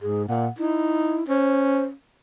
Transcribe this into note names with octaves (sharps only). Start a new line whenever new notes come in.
G#2 G#4
A#2 F#5
D#4 E4
C#4 C5